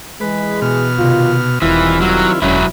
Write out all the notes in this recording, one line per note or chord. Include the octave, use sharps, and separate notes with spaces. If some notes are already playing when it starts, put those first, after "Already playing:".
E3 G#3 B4
B2 F6
C3 D#3 D#4 F4
E1 D#3 E3 G3 C4 E4 F4
F#3
E1 F#2 D3 F#3 C#4 E4